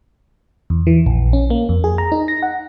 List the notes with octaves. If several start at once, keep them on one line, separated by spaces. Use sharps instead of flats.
E2
E3
A#1
C#4
A#3
F2
G#4
A#5
D#4
A#6
F#5